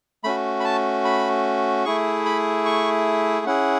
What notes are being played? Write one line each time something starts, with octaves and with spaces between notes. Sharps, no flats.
A3 C#4 F#4 B5
B5
A5
B5
A3 E4 G#4 C#6
B5
C#6
C#4 E4 G#4 F#5